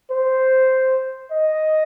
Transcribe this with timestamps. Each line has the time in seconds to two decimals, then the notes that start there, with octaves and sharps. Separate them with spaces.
0.11 C5
1.32 D#5